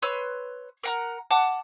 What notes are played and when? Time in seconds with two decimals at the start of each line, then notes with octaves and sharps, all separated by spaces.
0.02 B4 C#5 C6 E6
0.84 A#4 F#5 A#5
1.31 F#5 A5 D6